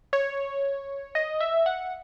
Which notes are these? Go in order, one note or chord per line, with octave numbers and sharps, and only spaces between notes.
C#5
D#5
E5
F#5